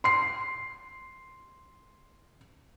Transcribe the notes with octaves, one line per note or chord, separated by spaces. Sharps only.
C6 C7